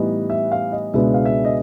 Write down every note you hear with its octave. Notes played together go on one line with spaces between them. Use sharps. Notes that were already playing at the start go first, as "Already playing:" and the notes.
Already playing: A2 E3 G3 B3 D#4 D#5
E5
F5
D#5
C#2 B2 G#3 B3 D4 E5
F5
E5
D#5